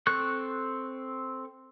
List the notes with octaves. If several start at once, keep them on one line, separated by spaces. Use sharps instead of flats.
C4 A4 C#6 F#6